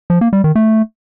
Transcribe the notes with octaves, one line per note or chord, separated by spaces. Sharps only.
F3
A#3
G3
D#3
A3